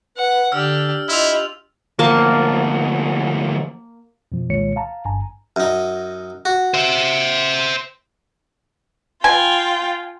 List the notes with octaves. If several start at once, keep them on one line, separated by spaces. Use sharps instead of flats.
B4 F#5
D3 D4 G4 E6 F6
E4 F4 G4 D#5 E6 F7
D2 F3 A#3 A5
F2 B2 F3
C2 A#2 D#3 G#3 C#5 C#7
F5 A5 A#5
G1 G2 G#5 A#5
F#2 D#4
F#4
C5 E5
F4 G5 G#5